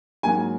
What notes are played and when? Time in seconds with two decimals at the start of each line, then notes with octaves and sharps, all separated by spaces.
0.23 G#2 F#3 A#3 G#5